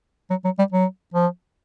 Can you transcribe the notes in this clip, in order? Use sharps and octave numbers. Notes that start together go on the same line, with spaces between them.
F#3
F#3
G3
F#3
F3